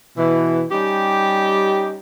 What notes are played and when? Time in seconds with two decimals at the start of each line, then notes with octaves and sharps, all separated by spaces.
0.18 B2 E3
0.72 G3 C#4 D#4 G4